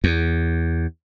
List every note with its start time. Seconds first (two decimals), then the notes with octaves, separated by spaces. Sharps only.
0.04 E2